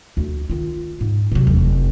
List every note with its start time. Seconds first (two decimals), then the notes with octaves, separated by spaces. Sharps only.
0.17 D2
0.50 D#3 F4
1.01 G#2
1.32 C3 F#3
1.47 F1 E2